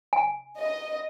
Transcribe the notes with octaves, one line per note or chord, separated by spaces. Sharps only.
G#5
D#5